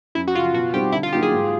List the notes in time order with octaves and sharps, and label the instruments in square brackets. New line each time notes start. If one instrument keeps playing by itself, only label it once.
[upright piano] F#2 [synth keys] E4
[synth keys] F#4
[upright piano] C#3 [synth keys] F4
[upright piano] F3
[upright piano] B2 [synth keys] F#4
[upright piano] G3 C4 D#4 [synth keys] G4
[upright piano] D3 [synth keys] E4
[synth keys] F4
[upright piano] F#3 A#3 D#4 F#4 [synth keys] G4
[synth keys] G#4
[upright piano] G#2